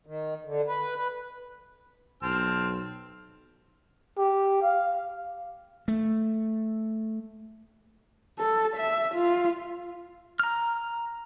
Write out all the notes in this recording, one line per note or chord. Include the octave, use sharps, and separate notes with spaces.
D#3
D3
B4
B4
B1 C4 A5 F6
G4
F5
A3
A4
E5
F4
A#5 F6